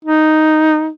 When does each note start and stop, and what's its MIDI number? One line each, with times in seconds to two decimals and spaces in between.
0.05 0.89 63